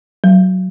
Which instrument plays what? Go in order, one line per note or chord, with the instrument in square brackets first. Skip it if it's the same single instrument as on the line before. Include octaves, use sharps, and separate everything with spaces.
[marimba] F#3